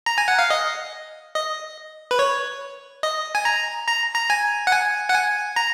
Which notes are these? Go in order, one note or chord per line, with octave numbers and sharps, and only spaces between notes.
A#5
G#5
F#5
F5
D#5
D#5
B4
C#5
D#5
G#5
A#5
A#5
A#5
G#5
F#5
G#5
F#5
G#5
A#5